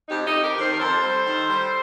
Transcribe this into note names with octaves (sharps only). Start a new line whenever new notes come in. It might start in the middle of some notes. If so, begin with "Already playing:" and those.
F2 D#4 G4
D#4 G4
F2
G4 A#4
D#3
A4 C5
A#4
F2 A4 C5
G3
D#3
G3